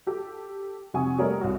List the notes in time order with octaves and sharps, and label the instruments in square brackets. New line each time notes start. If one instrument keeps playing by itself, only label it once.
[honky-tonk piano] G4 A4
F2 C3 F#5 G#5 C#6 D#6
G3 A3 A#3 A#4 C#5 D#5
C2 F#4